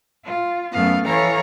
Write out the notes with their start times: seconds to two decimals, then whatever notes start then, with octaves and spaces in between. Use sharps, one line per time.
0.24 F4
0.72 F#2 A3 B3 F5
1.05 E3 A4 C#5 F5 A#5